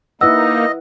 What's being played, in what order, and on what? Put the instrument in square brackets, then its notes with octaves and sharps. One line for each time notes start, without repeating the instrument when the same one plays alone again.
[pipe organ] A#3 D#4 [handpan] E4 B4 F#5 [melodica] D#5 [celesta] E6